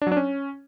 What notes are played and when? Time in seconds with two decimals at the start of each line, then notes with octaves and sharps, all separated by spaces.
0.02 D4
0.07 F#3
0.12 D4
0.17 C#4